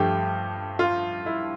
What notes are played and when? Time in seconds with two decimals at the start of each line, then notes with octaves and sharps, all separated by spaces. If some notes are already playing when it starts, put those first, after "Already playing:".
Already playing: G2 F3 A3 G4
0.79 F4
1.26 E4